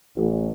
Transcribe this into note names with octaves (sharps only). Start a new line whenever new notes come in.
A1